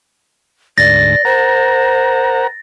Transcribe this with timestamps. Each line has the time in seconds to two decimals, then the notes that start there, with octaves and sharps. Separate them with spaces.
0.78 D2 G#2 D5 A6 A#6
1.25 A#4 C5 F#5 A#5